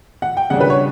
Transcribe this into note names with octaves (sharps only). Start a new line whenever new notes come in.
F#5
G5
C#3 G3 D4 F#5
B4
C#5